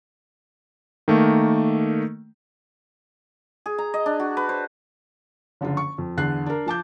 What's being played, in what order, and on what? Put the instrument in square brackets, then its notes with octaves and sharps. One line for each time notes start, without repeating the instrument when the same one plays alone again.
[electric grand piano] D#3 A3 A#3
[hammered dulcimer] G#4
A#5
D#5
D4
F#4
B4
C5
[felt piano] F#1 D3 F3 F4
C#6
F2
E2 D3 F#6 C7
D4 A#4
F3 A5 D6 G6